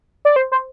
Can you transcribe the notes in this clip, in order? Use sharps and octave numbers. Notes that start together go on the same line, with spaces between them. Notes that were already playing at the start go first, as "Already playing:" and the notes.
D5
C5
C5